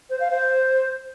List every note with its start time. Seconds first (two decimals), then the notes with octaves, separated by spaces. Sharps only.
0.10 C5
0.20 F5
0.31 C5